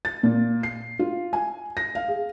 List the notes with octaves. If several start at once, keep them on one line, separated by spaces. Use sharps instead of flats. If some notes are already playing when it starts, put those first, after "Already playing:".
A6
A#2
C7
F4
G#5
A#6
F5
G#4